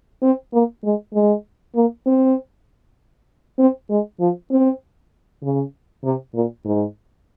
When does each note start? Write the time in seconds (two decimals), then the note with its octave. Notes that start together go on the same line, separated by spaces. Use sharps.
0.23 C4
0.53 A#3
0.84 G#3
1.14 G#3
1.76 A#3
2.06 C4
3.59 C4
3.90 G#3
4.20 F3
4.51 C4
5.43 C#3
6.04 C3
6.35 A#2
6.65 G#2